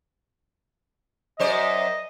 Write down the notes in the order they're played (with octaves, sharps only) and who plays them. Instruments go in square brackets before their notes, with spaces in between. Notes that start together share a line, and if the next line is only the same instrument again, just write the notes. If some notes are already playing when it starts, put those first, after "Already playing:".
[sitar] F#2 C5 D5 [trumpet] D#5